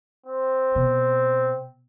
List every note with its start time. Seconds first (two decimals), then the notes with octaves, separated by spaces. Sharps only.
0.26 C4
0.75 B2